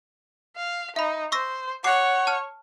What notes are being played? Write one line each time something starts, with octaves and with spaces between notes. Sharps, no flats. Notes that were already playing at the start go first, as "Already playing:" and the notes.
F5
D#4 E5 B5
C5 C#6 E6 A#6
C#5 F#5 D6 C7
A5 F6